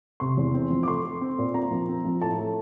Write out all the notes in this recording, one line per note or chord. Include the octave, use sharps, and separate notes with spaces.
C3 C6
E2
C4
F3
D6
A3 C6
A3
C4
A#2
C4 A#5
F3
C4
F3
A2 A5
A3